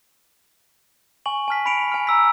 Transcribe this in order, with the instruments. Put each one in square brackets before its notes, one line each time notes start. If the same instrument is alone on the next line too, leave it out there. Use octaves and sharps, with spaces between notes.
[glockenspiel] G#5 C#6 F#7
G#5 A5 F6 B6
B5 B6 C#7 D7 F7
G#5 F6
A#5 E6 B6